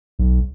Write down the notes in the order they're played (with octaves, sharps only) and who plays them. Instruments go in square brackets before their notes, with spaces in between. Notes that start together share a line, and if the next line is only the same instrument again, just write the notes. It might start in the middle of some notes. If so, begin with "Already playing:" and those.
[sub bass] B1